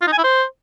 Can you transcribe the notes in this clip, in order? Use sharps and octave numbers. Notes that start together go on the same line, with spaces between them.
F4
D#4
G#5
E4
C5